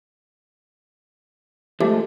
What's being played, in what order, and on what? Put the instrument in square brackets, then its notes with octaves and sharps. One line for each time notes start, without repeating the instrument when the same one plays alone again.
[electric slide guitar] F3 G#3 A3 [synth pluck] G4